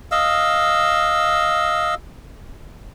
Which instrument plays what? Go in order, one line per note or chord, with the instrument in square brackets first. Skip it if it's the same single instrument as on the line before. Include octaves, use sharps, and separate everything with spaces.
[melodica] D#5 F5 E6